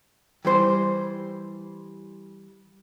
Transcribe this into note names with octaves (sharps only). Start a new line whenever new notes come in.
E3 G3 C5